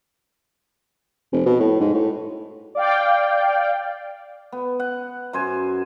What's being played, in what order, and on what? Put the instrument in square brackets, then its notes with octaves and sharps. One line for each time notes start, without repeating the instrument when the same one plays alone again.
[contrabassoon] F1
B2
A2
G#2
A2
[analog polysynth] D5 F5 G5
[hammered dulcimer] B3
F#5
F#2 C5 G#5